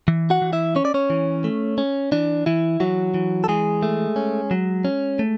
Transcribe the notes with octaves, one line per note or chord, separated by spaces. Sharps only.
E3
F#4 F#5
E3
E4 E5
C#4 C#5
D5
C#4 C#5
E3
A3
C#4
E3 D4
E3 E4
E3 F#3 F#4
E3
A4
E3 G#3 G#4
A3
C#4
F#3
C#4
A3